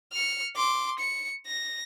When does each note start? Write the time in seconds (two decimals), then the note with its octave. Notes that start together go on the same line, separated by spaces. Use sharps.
0.12 F6 C#7
0.56 C6 D6
0.99 C#7
1.47 A#6